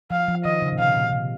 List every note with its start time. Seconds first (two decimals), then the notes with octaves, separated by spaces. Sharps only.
0.11 F3 F5
0.28 F3
0.45 D#3 D#5
0.62 C#3
0.72 A#2
0.79 C3 F5
0.96 A#2
1.12 C3